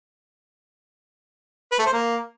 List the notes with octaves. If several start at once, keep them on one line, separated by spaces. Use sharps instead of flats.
B4
A3
C5
A#3